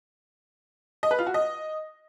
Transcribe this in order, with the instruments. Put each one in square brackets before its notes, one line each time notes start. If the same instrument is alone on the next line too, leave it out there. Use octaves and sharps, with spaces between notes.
[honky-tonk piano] D#5
B4
F4
F#4
D#5